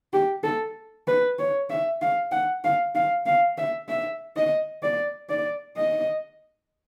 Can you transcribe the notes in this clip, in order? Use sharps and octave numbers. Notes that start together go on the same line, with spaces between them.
G4
A4
B4
C#5
E5
F5
F#5
F5
F5
F5
E5
E5
D#5
D5
D5
D#5